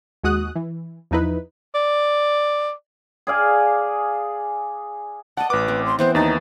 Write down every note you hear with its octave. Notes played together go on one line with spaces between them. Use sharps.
D#2 G#3 F#4 D#6 F#6
E3
E2 F3 D#4 E4 B4
D5
G#4 D5 F5 G#5
D5 D#5 F#5 A5
A1 B4 D6
C4
C6
E3 B3 C4 C5
D#2 D#4 A6